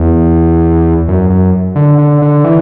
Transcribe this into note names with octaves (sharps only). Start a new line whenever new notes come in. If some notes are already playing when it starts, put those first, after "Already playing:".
Already playing: E2
F#2
F#2
D3
D3
D3
E3